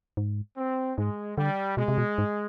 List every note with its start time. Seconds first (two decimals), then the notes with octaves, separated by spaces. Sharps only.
0.17 G#2
0.57 C4
0.98 G#2 G#3
1.38 D3 G3
1.77 B2 G#3
1.88 C3
1.98 B2
2.18 G#2